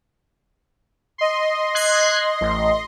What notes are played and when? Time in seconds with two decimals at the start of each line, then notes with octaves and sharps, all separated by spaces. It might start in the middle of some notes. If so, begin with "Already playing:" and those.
1.18 D#5 C6
1.75 F#6 G#6 C7
2.41 A1